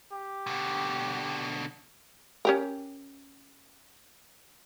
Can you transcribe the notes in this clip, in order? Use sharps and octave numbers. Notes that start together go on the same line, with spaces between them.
G4
B2 D3
C#4 G4 A#4